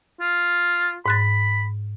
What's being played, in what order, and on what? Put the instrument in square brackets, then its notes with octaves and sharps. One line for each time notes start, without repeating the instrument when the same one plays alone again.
[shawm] F4
[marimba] G#2 F#6 A6 [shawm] B5